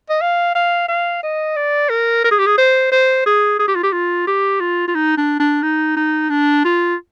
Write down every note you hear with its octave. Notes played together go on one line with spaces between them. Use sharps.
D#5
F5
F5
F5
D#5
D5
A#4
A#4
G#4
G4
G#4
C5
C5
G#4
G#4
G4
F4
G4
F4
G4
F4
F4
D#4
D4
D4
D#4
D#4
D4
F4